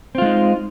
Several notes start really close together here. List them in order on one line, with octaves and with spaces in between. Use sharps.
C4 F4 G#3 D#4